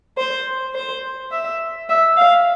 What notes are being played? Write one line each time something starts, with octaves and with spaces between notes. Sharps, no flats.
C5
C5
E5
E5
F5